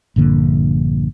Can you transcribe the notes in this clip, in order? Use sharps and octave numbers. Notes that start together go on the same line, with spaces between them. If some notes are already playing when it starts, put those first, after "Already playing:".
A#1 G2 D3 A#3